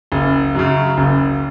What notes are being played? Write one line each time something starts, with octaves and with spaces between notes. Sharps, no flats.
F#1
F#2 C#3
F#1